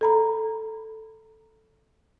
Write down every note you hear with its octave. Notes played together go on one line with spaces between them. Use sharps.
A4 A#5 B5